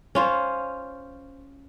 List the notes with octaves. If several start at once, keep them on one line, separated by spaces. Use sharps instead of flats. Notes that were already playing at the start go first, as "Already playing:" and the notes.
C#4 F4 C5